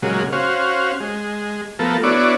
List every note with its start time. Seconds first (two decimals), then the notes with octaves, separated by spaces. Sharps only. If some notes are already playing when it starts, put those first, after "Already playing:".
0.02 A#2 C#3 F#3 G#3
0.32 C#4 F#4 C5 F5
1.00 G#3
1.79 F3 A3 B3 A4 A#4
2.03 B3 D4 E4 F#4 C#5 D5